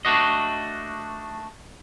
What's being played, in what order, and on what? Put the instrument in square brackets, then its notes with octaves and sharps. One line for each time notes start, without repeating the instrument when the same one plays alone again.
[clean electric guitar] A3 D4 F#4 D#5